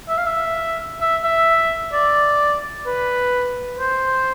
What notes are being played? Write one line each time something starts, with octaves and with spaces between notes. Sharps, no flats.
E5
F5
E5
E5
E5
D5
B4
C5